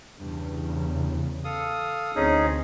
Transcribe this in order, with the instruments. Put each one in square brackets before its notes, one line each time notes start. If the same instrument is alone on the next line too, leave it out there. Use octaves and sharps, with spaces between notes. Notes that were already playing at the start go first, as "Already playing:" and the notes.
[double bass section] E2 C#3 [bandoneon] G2
[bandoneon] A4 F5 D#6
[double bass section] D2 C4 [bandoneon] C#4 D#4 G#4